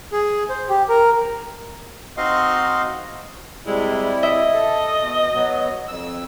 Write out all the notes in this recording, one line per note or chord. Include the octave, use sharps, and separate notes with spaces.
G#4
C5
G4
A#4
C4 D#4 F#4 D#5 F5 C6
C3 G3 G#3 E4
D#5 E5
A4
B2
F#3 B3
F2 E6